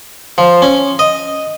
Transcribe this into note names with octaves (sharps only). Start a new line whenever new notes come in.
F3
C#4
D#5